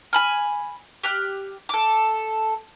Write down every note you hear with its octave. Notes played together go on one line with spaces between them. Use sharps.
G#5 B5 F6
G4 F6 F#6
A4 D6